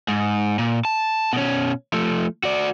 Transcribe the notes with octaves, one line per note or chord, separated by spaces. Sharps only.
G#2
A#2
A5
B2 C#4
F3 A3
F#4 D5